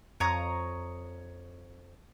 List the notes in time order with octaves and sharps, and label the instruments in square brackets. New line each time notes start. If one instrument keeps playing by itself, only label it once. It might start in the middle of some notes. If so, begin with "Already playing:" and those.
[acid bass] F2 [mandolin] C#5 A#5 D#6